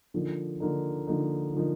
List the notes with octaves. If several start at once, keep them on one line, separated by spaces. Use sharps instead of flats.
D3 F3 A#3 D#4
D3 F3 A#3 D#4
D3 F3 A#3 D#4
D3 F3 A#3 D#4